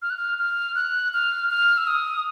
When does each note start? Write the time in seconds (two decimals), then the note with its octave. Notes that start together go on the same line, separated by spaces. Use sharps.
0.02 F6
0.10 F#6
0.17 F6
0.38 F6
0.75 F#6
1.13 F6
1.50 F6
1.77 E6
1.87 D#6